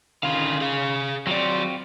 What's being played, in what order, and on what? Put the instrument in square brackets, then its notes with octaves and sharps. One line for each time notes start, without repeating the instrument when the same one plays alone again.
[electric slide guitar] D3 C#4 F5 [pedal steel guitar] D#3 F4 G#4
[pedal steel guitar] C#4 [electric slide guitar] G#4 F5
[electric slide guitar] F#3 D5 [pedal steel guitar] C4 F4 F#4